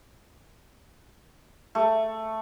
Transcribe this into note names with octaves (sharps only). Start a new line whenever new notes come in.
A3